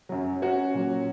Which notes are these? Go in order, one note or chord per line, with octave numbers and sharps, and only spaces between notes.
F#2 F#3
C#4 F#4
A#2 F#3